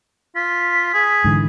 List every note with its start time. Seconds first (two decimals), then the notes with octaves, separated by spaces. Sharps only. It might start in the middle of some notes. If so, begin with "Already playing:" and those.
0.35 F4 B6
0.94 G#4
1.24 G#2 D3 E3